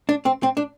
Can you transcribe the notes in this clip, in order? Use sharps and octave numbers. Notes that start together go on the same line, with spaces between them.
D4
C4
C4
D4